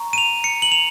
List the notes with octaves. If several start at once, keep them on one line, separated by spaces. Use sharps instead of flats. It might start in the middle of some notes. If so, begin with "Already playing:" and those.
Already playing: A#5 C#6
D#7
F7
C#7
F#7
F7